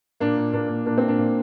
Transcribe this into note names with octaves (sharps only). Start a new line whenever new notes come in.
A#2 A#3 D4
A#2
A#2 A#3 D4
A#2
A#2 A#3 D4
C4
A#2
A#3 D4
A#2